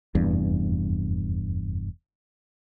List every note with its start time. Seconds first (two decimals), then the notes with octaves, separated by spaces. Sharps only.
0.15 F1 E2 G2